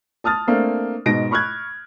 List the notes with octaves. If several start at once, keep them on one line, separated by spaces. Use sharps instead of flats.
A5 D#6 F6 A6
A3 A#3 C4 D4
G#2 B2 A#6 D7
B5 C#6 F6 F#6 G#6